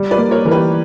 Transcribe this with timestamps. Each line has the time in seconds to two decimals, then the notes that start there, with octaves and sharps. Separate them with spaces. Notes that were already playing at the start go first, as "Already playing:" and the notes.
Already playing: G3
0.11 B4 D5
0.18 A#3
0.31 A#4 C#5
0.45 E3 A#4
0.51 G4 B4